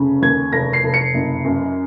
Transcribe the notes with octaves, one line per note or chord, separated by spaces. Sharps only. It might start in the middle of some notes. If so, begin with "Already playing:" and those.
Already playing: F1 C#3
D#2 G#6
F1 A#6
C7
F1
C#7
F#1
F#2